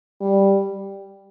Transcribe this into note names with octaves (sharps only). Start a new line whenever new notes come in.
G3